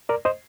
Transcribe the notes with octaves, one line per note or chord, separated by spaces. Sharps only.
A#4 D5
C5 D#5